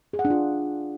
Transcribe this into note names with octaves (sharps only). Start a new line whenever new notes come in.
G#4
F#5
D4
F4